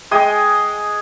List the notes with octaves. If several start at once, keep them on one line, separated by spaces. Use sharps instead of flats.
G#3 G5 G#5 D#6